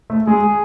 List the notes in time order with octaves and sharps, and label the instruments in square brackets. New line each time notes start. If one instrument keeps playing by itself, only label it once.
[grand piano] A3
[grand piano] G#3 [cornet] G#4